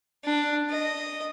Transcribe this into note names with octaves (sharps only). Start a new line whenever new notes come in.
D4
D#5